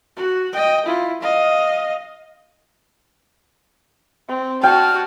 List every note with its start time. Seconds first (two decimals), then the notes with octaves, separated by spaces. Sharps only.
0.16 F#4
0.53 D#5 G5
0.86 E4 F4
1.21 D#5 F5
4.28 C4
4.63 F#4 G5 A5 F6